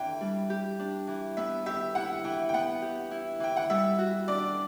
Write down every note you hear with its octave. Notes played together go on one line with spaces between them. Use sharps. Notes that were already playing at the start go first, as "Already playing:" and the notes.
Already playing: E3 D4 G5
G3
G4
D4
E3
B3 E5
G4 E5
E4 F#5
E3 G5
G5
B3 F#5
G4
E4
E3 G5
F#5
G3 E5
F#4
D4 D5